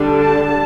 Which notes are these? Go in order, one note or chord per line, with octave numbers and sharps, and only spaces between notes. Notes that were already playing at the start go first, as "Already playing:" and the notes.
Already playing: D3 G3 D4
A5